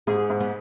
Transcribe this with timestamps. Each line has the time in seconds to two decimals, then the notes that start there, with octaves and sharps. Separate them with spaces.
0.07 G#2 G#4
0.30 G#2
0.40 B3